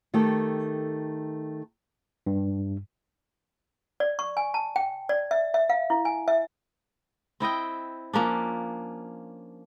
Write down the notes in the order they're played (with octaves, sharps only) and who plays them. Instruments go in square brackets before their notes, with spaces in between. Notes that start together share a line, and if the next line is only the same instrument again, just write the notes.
[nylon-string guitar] D#3 A3 G4 A4
[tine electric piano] G2
[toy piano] D5
C#6
G#5
A5
G5
D5
E5
E5
F5
E4
G#5
E5
[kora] C4 E4 D#5 G5
F3 A#3 C#4 D4